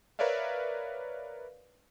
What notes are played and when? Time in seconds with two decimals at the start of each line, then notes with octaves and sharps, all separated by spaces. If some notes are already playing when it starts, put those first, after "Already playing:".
0.19 A#4 B4 C#5 D5 E5 F5